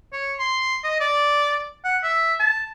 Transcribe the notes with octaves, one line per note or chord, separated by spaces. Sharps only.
C#5
C6
D#5
D5
F#5
E5
A5